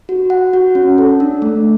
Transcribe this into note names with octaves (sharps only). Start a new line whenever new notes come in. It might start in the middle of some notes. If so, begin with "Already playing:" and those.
F#4
F#5
F#4
C#4
A4
D4
A3